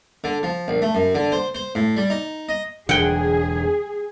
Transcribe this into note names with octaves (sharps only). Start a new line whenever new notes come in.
D3
F3
A#1
A3
F#2
D3
C5
C5
A2
G3
D#4
D#5
E1 D3 G#4 F#5 G5